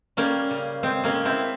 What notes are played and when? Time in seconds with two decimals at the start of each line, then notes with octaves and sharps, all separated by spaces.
0.17 G3 A#3 C#4
0.51 C#3
0.83 G#3 C4
1.04 A#3 C#4
1.15 G#3
1.25 C4 E4